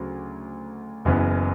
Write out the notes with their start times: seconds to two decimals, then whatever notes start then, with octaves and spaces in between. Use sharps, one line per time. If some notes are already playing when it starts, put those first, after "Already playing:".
Already playing: D2 C#3 F#3
1.05 F#1 F#2 C#3 E3 B3